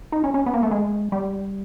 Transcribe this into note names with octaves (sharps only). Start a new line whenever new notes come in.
D#4
C#4
C#4
B3
A#3
A3
G#3
G3